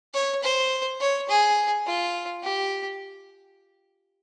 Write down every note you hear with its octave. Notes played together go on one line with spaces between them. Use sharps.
C#5
C5
C#5
G#4
F4
G4